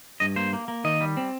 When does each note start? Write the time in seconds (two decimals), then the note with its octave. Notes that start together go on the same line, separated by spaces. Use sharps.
0.20 G2 D#5
0.36 A#3 C5
0.53 A#3
0.68 A#3
0.84 D#3 D#5
1.01 G3
1.17 C4